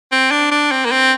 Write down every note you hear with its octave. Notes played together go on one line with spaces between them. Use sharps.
C4
D4
D4
C4
A#3
C4